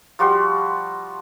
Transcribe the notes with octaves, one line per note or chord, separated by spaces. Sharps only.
F3 G3 F#4 C6